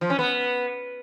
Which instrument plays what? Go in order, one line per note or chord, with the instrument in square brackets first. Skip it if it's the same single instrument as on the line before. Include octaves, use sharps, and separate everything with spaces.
[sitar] F3
C#4
B3